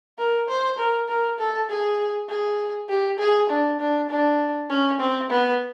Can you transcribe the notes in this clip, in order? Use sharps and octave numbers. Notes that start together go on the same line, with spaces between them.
A#4
C5
A#4
A#4
A4
G#4
G#4
G4
G#4
D4
D4
D4
C#4
C4
B3